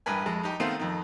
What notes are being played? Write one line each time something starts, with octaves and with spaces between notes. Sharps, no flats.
A1 G2 A#4 B4 G#5
F2 G#3
D#4 G4
D#3 A3 B3 C4 F4 C5
F2 D#3